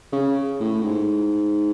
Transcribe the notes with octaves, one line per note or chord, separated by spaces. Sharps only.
C#3
A2
G#2